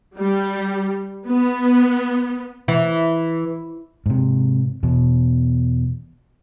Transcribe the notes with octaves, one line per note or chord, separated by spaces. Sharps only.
G3
B3
E3
G#2 C3
E2 B2